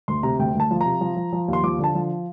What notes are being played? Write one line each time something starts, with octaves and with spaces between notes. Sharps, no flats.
D2 C6
C3 A#5
D2 G5
D2 A5
F3
C3 A#5
F3
F3
F3
D#2
C6
F3 D6
D3 A5
F3